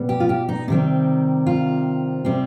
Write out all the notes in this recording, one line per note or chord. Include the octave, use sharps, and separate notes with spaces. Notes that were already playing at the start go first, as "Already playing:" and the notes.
Already playing: B2 G3 B3
G4
F4
G4
D#4
C3 D#3 G3 C4
F4
C3 G3 C4